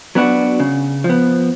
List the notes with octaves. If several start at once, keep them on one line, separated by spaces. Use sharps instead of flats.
F#3 B3 D4 F#4
C#3
F3
B3